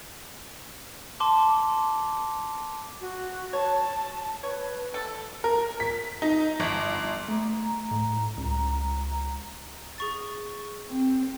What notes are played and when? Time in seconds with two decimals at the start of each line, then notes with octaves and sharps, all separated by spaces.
1.20 A5 C6 D6
3.01 F#4
3.53 C#5 A5
4.43 B4 C#5
4.94 A4
5.44 A#4
5.80 B6
6.22 D#4
6.60 G1
7.28 A3 A#5
7.91 A2
8.37 C#2
9.98 G#4 C#6 A6
10.88 C4